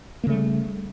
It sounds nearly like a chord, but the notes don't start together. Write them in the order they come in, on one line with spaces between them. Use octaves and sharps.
A#3 C#3 A3 G3